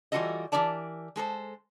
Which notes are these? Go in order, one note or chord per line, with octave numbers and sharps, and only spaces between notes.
E3 G3 F4 F#4 A4 D#5
E3 F4 G4 A#4 D5 A5
G#3 A4 A#4 C5